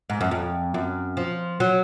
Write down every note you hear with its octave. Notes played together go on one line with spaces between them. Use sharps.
G#2
F#2
F2
F#2
F3
F#3